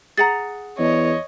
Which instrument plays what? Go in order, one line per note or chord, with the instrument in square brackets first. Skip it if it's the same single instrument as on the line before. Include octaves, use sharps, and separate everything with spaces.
[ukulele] G#4 F#5 A#5 [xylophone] A6
[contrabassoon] E2 [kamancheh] C#5 D#5